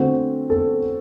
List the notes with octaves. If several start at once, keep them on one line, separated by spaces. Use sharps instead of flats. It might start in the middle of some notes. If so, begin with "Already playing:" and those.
Already playing: D3 A3 C4 F#4
A4